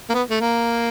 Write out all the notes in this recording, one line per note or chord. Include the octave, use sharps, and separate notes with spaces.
A#3
B3
A3
A#3